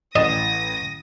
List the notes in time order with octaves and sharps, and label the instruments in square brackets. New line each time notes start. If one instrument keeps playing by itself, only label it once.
[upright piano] A1 A6 E7 [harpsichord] D#5 [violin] D#6 A#6